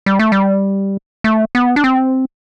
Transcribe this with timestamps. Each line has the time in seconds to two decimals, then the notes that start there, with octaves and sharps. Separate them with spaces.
0.06 G3
0.19 A3
0.32 G3
1.24 A3
1.55 B3
1.76 D4
1.84 C4